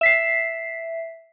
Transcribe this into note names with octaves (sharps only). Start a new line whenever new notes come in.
E5 B6 C7